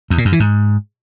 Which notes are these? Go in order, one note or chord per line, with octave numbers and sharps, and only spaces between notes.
E2
A#2
F#2
E3
G#2